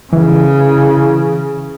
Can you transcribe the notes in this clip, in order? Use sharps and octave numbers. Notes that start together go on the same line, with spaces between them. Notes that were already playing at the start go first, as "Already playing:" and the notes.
C#3 E3